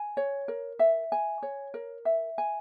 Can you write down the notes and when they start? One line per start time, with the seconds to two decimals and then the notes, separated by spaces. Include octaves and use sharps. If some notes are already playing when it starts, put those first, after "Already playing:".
Already playing: G#5
0.17 C#5
0.48 A#4
0.79 E5
1.12 G#5
1.43 C#5
1.74 A#4
2.05 E5
2.38 G#5